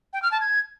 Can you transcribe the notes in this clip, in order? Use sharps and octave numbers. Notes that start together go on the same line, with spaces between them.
G5
F6
A5
G#6